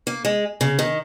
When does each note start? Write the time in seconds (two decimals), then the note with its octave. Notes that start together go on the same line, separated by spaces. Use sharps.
0.07 A#3
0.25 G#3
0.61 C#3
0.79 D#3